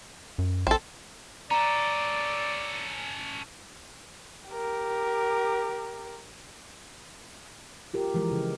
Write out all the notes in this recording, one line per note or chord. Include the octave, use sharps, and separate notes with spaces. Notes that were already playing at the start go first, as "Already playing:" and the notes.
F#2
A#1 C4 A4
C#4 A4 D5 A#5
G4 A#4
F4 G4 A#4
E3 F3 G#3 A#4
C#3